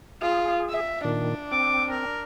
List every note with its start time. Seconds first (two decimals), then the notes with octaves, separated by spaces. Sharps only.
0.22 F4 G#4
0.70 E5
1.05 A#2 D#3 D4
1.52 C4 D6
1.90 A#4